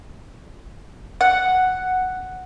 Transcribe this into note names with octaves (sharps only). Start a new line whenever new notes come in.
F#5